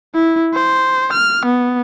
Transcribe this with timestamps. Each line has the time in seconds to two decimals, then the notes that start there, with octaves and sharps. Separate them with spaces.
0.15 E4
0.54 C5
1.13 F6
1.46 B3